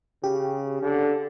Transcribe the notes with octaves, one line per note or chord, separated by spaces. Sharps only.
C#3 G4
D3